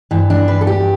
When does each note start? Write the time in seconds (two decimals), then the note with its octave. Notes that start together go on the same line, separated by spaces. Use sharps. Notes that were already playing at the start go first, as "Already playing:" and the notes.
0.11 G2 E3
0.30 D4
0.48 B4
0.61 A4
0.67 G4